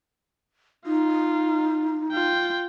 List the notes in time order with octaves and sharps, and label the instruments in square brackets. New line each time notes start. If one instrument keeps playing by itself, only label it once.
[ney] D#4 [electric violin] F4
[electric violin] F4 G5